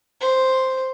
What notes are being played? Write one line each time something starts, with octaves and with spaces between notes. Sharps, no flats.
C5